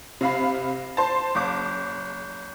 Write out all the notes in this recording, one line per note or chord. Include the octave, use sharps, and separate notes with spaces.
C3 F5 B5
C5 A5
F#1 D6